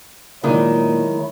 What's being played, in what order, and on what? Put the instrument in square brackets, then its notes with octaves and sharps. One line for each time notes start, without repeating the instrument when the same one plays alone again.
[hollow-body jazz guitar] A#2 [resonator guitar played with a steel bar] D#3 G#3 [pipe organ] F#3 A3 E4